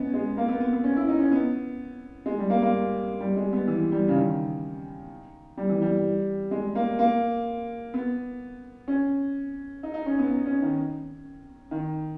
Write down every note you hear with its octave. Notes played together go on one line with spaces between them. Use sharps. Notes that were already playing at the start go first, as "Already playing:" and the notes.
Already playing: B3 C#4 D#4
G#3
A#3
B3
B3
B3
C#4
E4
D#4
C#4
B3
G#3
G3
A#3
A#3
G3
G#3
B3
E3
G3
C#3
D#3
G3
E3
G3
G#3
A#3
A#3
B3
C#4
D#4
D#4
C#4
B3
D#4
C#4
D#3
D#3